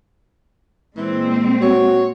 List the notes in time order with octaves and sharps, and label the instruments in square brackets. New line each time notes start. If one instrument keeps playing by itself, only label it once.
[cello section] A#2 G#3 C4 [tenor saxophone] E3
[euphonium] F#4 [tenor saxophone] C#5